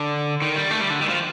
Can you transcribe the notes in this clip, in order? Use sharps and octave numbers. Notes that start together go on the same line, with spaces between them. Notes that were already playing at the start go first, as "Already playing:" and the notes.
Already playing: D3
D#3
G3
A3
G3
D3
D#3
F3